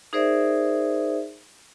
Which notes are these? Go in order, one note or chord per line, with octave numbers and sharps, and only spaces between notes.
D#4 G#4 A#4 C5 D5 E5